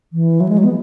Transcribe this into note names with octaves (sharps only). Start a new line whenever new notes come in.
E3
F#3
G#3
F#3
B3